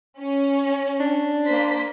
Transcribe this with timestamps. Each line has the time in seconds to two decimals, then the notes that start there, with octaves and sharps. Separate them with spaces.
0.20 C#4
1.00 D4
1.46 A#3 C5 B6